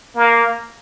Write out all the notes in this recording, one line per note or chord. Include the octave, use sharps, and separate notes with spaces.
A#3